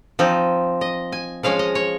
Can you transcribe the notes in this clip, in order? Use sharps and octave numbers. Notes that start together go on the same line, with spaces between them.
F3 C4 D#4
D#5
G#5
F3 G#3 C#4 F5
D#5
C#5